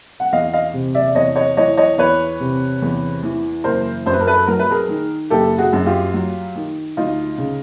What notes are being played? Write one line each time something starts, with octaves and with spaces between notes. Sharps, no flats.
F#5
E2 D#5 F5
D#5 F5
C3
D5 E5
E2 C#5 D#5
C#5 D#5
E3 C#5 D#5
C#5 D#5
E2 B4 C#5
C3
E2
E3
F#1 A#4 C5
F#2 C5
B4
A#4
A4 B4
F#3 A#4
B4
G#4 A#4
D#3
F#1 G4 A4
F#4 G#4
F#2
F4 G4
F#3
D#3
D2 D#4 F4
C#3